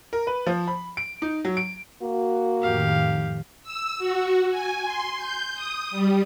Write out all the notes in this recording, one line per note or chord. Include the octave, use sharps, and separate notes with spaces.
A#4
B4
F3
B5
D7
D#4
F#3
D7
A#3 F#4
F2 A2 D#3 G4 F5
E6
F#4
G#5
C6
G6
D#6
G3